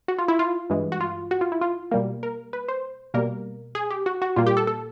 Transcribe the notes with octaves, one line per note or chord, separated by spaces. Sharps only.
F#4
F4
E4
F4
G2 E3 G#3
F#4
F4
F#4
F4
E4
F4
B2 G3 A#3
A#4
B4
C5
B2 G3 A#3 A#4
G#4
G4
F#4
F#4
A#2 G3 A#3 F4
G4
A4
A4